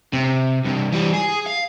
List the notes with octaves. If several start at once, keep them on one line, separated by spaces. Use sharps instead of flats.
C3
G2 C3
E3 G3
G#4
F5